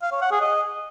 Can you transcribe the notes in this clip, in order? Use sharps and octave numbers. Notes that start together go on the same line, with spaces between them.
F5
C#5
F#5
G#4
D#5